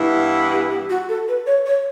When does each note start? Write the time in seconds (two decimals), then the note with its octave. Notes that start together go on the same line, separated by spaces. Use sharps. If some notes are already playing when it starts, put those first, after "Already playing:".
Already playing: G2 E3 B3 E4
0.52 G4
0.70 G4
0.89 F#4
1.08 A4
1.27 B4
1.46 C#5
1.65 C#5